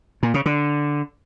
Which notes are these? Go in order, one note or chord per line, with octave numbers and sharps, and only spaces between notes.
A#2
C#3
D3